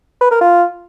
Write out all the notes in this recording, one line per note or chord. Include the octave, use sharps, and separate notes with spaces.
B4
A#4
F4